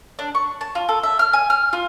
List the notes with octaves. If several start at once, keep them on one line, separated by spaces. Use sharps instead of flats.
D4
C#6
A5
F4
A4
E5
F6
G#5
F6
F4